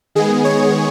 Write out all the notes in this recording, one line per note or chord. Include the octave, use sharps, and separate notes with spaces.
D#3 G#3 B3 G#4
C#5